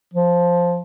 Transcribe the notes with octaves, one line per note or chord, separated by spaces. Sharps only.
F3